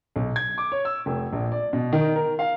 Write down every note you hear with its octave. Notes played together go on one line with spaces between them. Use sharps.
B1
G#6
D6
C#5
E6
F1
A#1
D5
B2
D#3
A#4
F5